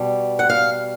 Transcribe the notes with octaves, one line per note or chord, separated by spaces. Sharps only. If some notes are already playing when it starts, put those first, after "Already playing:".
Already playing: B2 G3
F#5
F5